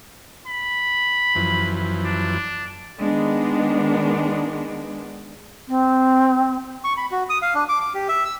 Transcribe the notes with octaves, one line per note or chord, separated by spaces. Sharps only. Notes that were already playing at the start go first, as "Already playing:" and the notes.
B5
F#2 E3 F3
D4
D#3 G#3 B3 D4
C4
C#6
B5
F#4
D#6
F5
D4
D6
D6
G4
E5
E6